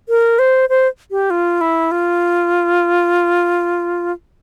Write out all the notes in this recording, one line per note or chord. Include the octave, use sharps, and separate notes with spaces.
A#4
C5
C5
G4
F4
E4
F4